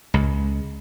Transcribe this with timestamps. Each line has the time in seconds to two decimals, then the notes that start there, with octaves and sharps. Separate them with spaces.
0.14 C#2